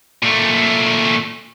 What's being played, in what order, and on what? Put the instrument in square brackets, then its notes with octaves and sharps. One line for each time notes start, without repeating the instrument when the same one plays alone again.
[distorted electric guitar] A#2 A3